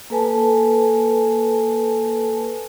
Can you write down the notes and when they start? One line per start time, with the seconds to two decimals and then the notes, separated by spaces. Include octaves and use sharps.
0.10 A#3 A4 B4 G#5 A5